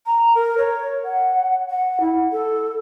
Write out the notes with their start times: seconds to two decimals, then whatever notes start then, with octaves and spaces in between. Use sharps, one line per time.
0.07 A#5
0.35 A#4
0.58 C#5
1.05 F#5
1.70 F#5
2.00 E4
2.32 A4